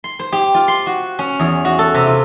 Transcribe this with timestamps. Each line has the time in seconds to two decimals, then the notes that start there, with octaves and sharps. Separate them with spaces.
0.04 C6
0.19 C5
0.32 G4
0.54 F4
0.68 C6
0.87 F#4
1.19 C#4
1.39 E2
1.65 F#4
1.79 A4
1.94 C3
2.06 F4